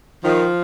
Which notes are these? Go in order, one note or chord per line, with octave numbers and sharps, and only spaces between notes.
D#3 F3